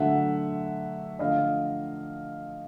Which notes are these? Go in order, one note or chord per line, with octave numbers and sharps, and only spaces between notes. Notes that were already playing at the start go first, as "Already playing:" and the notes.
Already playing: D3 F#3 A3 E5 F#5
D3 F3 A3 D#5 F5